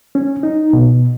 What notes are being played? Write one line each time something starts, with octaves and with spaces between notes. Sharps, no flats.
C#4
D#4
B2